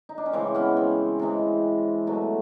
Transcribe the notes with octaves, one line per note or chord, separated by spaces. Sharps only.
D#4
D4
C#4
C#3 E3 G#3 C4
B3 C#4
C4
C3 E3 G#3
B2 F#3 A3